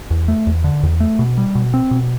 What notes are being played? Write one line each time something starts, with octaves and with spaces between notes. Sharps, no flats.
E2
A3
E2
D3
E2
A3
B2
G3
B2
C4
B2